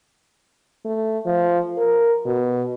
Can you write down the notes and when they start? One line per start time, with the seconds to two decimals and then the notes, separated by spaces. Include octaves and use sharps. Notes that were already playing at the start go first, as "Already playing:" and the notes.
0.85 A3
1.26 F3
1.78 A#4
2.25 B2